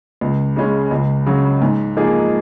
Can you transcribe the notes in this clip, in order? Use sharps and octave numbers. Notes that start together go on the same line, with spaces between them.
C#2
C#3 G#3 C#4
C#2
C#3 F#3
G#2
F3 A#3 D#4 G#4